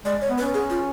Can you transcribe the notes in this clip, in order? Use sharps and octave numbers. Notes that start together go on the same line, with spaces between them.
G#3 D5
C#5
B3
B4
C#4
G#4
F4